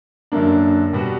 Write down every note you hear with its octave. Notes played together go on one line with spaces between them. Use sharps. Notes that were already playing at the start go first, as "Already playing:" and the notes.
F#2 D3 A#3 D4
B2 G3 B3 F#4